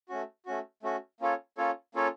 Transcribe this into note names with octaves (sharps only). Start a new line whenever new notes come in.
A3 C#4 F#4
A3 C#4 F#4
A3 C#4 F#4
A#3 C#4 F4 A4 C#5
A#3 C#4 F4 A4 C#5
A#3 C#4 F4 A4 C#5